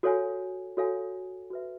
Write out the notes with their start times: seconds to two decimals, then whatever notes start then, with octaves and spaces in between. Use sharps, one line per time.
0.03 F#4 A4 C#5 F5 G#5
0.77 F#4 A4 C#5 F5 G#5
1.51 F#4 B4 E5